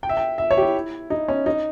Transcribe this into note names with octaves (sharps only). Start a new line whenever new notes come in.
G5
E5
G5
E5
C#5
G4
E4
D#4
C#4
D#4